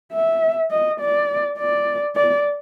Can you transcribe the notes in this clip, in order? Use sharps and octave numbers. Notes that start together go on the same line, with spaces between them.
E5
D#5
D5
D5
D5